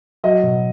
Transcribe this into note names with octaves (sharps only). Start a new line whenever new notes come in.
F#3 D#5
B2